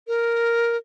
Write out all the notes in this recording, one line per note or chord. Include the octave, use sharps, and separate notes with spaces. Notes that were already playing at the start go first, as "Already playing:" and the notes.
A#4